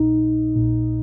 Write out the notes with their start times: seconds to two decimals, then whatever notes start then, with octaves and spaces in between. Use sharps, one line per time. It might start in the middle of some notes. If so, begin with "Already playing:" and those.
Already playing: A#1 A#2 D#4
0.56 A#2
0.61 A#1